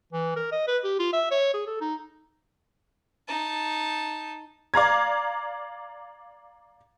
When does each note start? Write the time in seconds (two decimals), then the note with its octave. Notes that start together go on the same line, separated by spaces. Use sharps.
0.12 E3
0.36 A#4
0.52 D#5
0.67 B4
0.84 G4
0.99 F4
1.13 E5
1.31 C#5
1.54 G#4
1.67 A4
1.81 D#4
3.28 D#4 A5
4.74 D5 F5 A#5 G#6